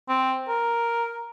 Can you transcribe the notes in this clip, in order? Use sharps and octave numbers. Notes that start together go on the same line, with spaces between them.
C4
A#4